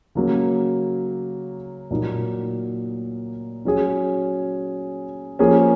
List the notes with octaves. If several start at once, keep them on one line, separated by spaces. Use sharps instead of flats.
C#3 F#3 A#3
A#2 F#3 A#3 D#4
F#3 C#4 G#4
F3 A#3 C#4 G#4